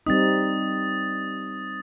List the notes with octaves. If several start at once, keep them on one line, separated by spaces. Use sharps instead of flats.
G3 C4 D#4 D#6 A6